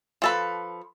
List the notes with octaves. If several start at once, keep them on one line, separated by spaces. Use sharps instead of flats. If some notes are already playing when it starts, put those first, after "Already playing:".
F3 A4 B4